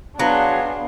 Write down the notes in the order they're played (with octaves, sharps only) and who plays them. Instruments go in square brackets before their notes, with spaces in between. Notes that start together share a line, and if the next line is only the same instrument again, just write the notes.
[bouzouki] F#3 [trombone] B3 [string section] D4 G#4 C6 [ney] F5